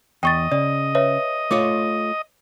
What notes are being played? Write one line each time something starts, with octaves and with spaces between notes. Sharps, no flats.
E2 D#5 G5 C#6 A6
C#3 D5
B4 C#5 E5
A3 F4 C#5 D6